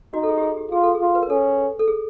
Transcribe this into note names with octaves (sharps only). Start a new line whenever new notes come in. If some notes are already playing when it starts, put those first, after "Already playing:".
D#4 F#4
A4
G#4
G4
G#4
G4
F4 G#4
A4
G#4
F4
B4
A#4
C#4 A4
A4
G#4